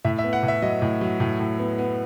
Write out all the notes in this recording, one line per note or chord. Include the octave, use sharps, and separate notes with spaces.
A2 E5
E5
B3
F#5
A2
E5
F#3 D#5
A2
F#3
A2
A2
B3
B3